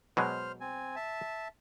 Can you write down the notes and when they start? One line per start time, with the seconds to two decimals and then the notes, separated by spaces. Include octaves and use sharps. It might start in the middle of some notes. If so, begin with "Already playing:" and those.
0.17 B2 F#3 G#3 C5 F6
0.60 C4 G#5
0.96 E5 A5